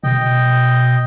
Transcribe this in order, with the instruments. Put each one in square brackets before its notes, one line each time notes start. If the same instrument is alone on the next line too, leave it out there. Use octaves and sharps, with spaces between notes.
[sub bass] B2 [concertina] D#5 G5